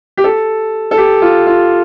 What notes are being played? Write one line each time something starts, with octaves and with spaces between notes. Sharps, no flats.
G4
A4
A4
G4
F4
F4